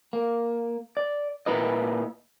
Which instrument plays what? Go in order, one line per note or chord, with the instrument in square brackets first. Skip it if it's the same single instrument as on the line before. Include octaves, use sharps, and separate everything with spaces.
[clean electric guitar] A#3
D5
A#2 A#3 E4 B4 D#5